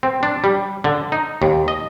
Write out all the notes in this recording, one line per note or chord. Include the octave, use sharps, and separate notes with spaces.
C4
D4
G3
D3
D#4
D#2
D#5